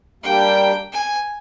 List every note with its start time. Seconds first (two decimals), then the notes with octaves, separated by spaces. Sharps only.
0.23 G3 A#3 D4 G4 G5
0.92 G#5